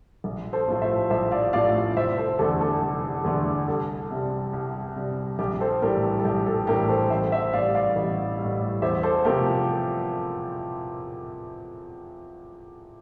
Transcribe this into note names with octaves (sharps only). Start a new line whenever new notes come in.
A#1
A4 C5
A2 F3 A3
C5 E5
A#1 C5 E5
D5 F5
A2 F3 A3 D5 F5
F1 C5 E5
A4 C5
E2 D3 A3 A4
A4
F1
E2 D3 A3
C2 A4
C3 G3
C2
C3 G3
A#1 G4
A4 C5
A2 E3 G3 G4 A#4
G4
A4
A#1 G4
A4
A2 E3 G3 G4 A#4
A4 C5
A1 C5 E5
C5 E5
A2 G3 D5 F5
D5 F5
A1
A2 G3
E2 C5 E5
A4 C5
C3 F3 A3 G4 A#4